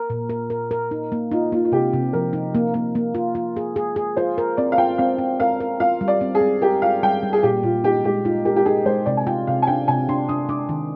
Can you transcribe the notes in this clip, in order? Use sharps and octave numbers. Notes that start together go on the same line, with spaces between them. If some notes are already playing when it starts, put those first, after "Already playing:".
Already playing: A#4
A#2
A#4
A#4
A#4
D#4
A#3
D#4 F4
A#3 F4
F4
C3 G4
C3
F3 A#4
D#4
A#3
A#3
A#3
F4
F4
G#4
G#4
G#4
F4 C5
A#4
C4 D5
F5
F4 G5
C4 F5
C4
A#4 F5
A#4
F4 F5
G3
D5
C4
G#4
C4
G4 A#4
F4 F5
G3 G5
G3
G#4
A#2 G4
A#2 F4
D#4 G4
G#3 G4
D#4 F4
G4 A#4
G4
D#4 G#4
G#3 C5
C3 D5
G#5
F4 G5
C3 F5
G#5
D4 G5
C3 G#5
D4 C6
D4 D#6
D4 D6
D#3